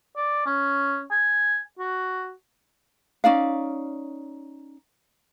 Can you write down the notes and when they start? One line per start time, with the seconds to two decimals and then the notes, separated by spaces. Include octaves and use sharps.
0.16 D5
0.47 C#4
1.11 G#5
1.79 F#4
3.24 C#4 D#4 D5 F5